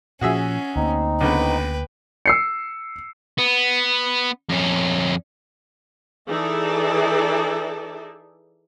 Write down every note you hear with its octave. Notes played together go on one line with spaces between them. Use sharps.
A#2 F3 C#4 F#4 G#4 E5
D2 A3 A#3 C4 D#4
C#2 D3 B3 B4 G5
E6 C7 C#7
B3
F2 C#4
E3 D#4 G#4 A4 D5 E5